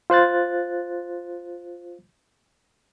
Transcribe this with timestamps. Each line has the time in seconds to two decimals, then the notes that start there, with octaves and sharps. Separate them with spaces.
0.10 F4 C5 F#6 A6